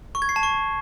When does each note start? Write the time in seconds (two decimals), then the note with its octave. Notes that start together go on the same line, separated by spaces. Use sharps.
0.15 C#6
0.22 G#6
0.29 C7
0.36 A5
0.43 C#6